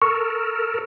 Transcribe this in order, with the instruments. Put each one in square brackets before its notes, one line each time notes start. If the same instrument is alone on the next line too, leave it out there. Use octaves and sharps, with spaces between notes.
[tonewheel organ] A4 A#4 [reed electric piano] C#6